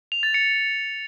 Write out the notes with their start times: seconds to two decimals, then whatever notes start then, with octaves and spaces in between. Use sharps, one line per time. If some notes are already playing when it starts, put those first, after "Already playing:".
0.12 F7
0.23 A6
0.34 C#7